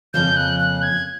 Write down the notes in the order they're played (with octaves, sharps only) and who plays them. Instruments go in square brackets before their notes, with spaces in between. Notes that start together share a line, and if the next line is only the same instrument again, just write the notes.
[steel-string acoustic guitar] F2 C#3 F3 A#3 C#4 [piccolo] G6
[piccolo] F#6
F#6
G#6